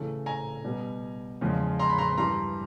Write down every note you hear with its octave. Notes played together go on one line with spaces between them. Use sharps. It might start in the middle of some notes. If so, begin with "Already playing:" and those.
Already playing: C#3 E3 A3
G#5 A#5
B2 G3 B3
E2 C#3 F3 G#3
A#5 C6
B5
A#5 C6
G2 E3 G3 A#5 C6